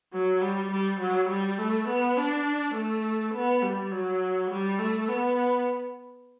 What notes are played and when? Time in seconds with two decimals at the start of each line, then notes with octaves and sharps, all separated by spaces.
0.13 F#3
0.42 G3
0.71 G3
1.00 F#3
1.29 G3
1.58 A3
1.88 B3
2.16 D4
2.75 A3
3.34 B3
3.63 G3
3.91 F#3
4.50 G3
4.79 A3
5.08 B3